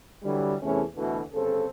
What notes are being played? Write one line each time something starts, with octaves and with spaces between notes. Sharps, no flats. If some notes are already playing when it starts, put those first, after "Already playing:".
D3 E3 F#3 G3
E2 A2 C3 E3 A3 C#4
D2 B2 D3 E3 A3
G1 C#3 C4 A4